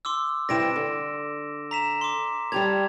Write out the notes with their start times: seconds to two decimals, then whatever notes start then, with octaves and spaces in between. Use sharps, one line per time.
0.05 C6 D6 E6
0.49 G2 C3 E4 A#6 D7 E7
0.76 D3
1.71 A#5 B6 E7
2.01 C6 D6
2.52 G3 G4 A5 G#6 F7